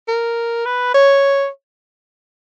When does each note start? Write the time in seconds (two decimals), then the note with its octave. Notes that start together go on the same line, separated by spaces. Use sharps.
0.09 A#4
0.66 B4
0.94 C#5